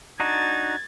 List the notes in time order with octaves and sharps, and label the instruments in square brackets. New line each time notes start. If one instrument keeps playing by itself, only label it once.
[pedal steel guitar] D4 D#4 F#4 [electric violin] G#6 A6